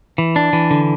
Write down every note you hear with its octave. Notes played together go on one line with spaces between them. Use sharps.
E3
D4
E3
D3